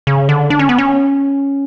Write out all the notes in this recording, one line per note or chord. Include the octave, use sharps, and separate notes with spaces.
C#3
D3
D4
C#4
B3
C#4